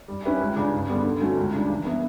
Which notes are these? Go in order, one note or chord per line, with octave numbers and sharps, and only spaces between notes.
G3
C#4 G4 B4 E5
C#2
C#3 G3 D4
G2
D3 G3 B3
D3
F#3 A3 C#4
C#2
C#3 G3 D4
E3
B3 E4 B4